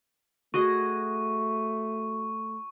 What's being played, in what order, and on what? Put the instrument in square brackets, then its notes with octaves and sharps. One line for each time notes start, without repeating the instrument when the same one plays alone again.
[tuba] A3 [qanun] F#4 G#4 D#5 [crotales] C#6